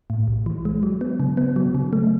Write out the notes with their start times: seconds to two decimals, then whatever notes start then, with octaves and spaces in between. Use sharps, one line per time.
0.10 A2
0.28 B1
0.46 E3
0.65 G#3
0.83 F#3
1.01 B3
1.20 C#3
1.37 B3
1.56 F#3
1.75 C#3
1.93 A3